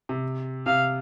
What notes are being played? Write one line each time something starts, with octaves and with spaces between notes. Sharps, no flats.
C3
C3 F5